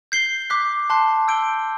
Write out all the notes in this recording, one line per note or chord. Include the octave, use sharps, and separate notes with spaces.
G6 C7 G7
D6 F#6 B6
A5 C6 F#6 C7
E6 G6 D7 G7